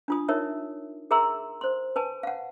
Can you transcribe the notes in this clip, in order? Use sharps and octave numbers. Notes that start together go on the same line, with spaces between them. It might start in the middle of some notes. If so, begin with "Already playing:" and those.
D4 F4 D#6
D#4 A#4 C#5 E5
G#4 A#4 E5 A#5 C6 E6
C5 C6
B4 G#5 A5
F5 F#5